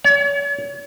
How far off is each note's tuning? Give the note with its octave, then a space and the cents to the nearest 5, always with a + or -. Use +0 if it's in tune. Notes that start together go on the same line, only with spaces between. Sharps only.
C#5 +40